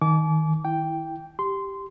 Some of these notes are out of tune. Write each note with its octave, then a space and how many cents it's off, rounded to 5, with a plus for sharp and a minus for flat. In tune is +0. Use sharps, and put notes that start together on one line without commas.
D#3 +15 G#5 +45 D6 -30
E4 +0 G5 +0
G4 +0 C6 -15